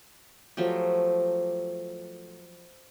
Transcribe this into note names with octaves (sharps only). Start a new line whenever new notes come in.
F3 F#3 A3 G4